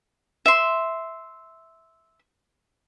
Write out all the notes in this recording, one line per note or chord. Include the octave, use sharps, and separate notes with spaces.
E5 C6